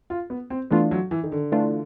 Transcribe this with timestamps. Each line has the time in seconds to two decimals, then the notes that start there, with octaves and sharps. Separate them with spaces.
0.10 F4
0.30 B3
0.50 C4
0.71 E3 A3 B3 D4 F4
0.91 F#3
1.11 E3
1.24 D#3
1.32 D3
1.52 E3 A3 D4 F4